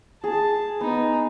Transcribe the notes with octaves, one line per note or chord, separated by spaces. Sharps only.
G#4 A5
B3 D#4